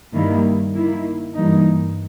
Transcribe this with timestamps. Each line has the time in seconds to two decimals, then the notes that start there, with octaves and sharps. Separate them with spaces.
0.12 G2 D#3 G3 A#3 E4
0.73 D#3 A#3 E4
1.34 G2 E3 A#3 D#4